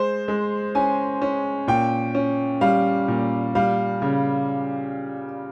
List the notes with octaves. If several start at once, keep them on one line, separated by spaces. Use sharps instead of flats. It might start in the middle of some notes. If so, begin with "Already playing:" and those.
Already playing: G#3 C5
G#3
C#4 G#5
C#4
A#2 G5
C#4
G3 F5
A#2
G3 F5
C#3